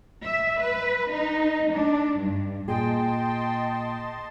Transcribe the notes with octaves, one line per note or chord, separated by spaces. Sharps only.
E5
B4
D#4
D4
G2
A#2 G#4 D#5 G5 A5 C6